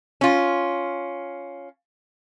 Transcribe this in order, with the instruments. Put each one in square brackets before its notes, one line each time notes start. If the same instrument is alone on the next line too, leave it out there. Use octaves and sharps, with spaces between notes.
[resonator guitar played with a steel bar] C#4 F4